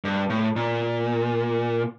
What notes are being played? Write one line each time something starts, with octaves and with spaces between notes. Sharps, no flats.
G2
A2
A#2